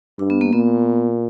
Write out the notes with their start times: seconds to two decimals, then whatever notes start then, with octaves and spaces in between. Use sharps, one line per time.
0.18 G2 D4
0.30 B3
0.41 A#3
0.53 A#2 B3